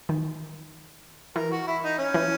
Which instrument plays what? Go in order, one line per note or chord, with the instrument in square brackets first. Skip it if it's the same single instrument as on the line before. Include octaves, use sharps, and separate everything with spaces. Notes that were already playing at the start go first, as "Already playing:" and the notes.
[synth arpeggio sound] D#3
[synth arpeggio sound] E3 [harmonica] A#4
[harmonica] F#4
E4
D#4
C#4
[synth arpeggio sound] E3